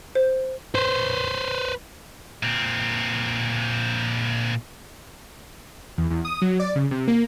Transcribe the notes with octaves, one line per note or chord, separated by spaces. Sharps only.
C5
B4 C5
A#2 C4
E2
E2
D#6
F#3
D5
C#3
C3
A#3